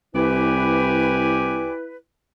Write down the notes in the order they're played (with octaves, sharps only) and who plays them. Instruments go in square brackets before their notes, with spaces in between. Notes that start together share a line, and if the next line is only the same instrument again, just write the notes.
[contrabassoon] C2 [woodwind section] E4 B4 [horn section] G4 D5 G#5